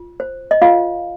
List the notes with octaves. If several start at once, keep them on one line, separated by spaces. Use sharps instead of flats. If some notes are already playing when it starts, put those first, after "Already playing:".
Already playing: F4
C5
D#5
F4 C5 F5